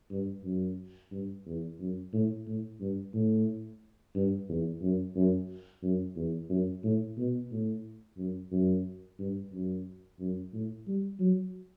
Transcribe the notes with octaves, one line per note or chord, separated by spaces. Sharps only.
G2
F#2
G2
E2
F#2
A2
A2
G2
A2
G2
E2
F#2
F#2
F#2
E2
F#2
A2
B2
A2
F#2
F#2
G2
F#2
F#2
A2
G3
F#3